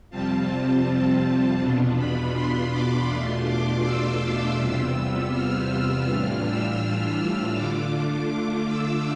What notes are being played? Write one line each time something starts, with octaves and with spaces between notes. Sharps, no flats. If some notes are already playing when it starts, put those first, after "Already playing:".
F2 C3 G3 C4 F4 A5
E2 B2 B3 D4 F4
B5
C6
D6
E2 B2 A3 D4 F4 C6
D6
E6
E2 C3 G3 B3 F4 E6
E6
F6
E6
A2 E3 G3 D4 F4 F6
E6
F6
E6
D3 A3 D4 F4 D6
D6
E6